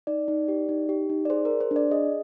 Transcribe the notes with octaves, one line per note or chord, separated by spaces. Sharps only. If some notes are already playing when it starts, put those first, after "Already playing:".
D#4 D5
D#4
G4
D#4
G4
D#4
D5
G#4 C5
A#4
G#4
C5
D4
D5
G#4 D#5